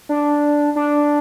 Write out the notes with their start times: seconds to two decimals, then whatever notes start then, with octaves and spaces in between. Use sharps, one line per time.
0.09 D4
0.76 D4